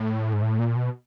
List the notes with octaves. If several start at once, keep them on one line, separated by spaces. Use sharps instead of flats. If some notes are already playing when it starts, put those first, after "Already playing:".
Already playing: A2
G#2
A2
A#2
B2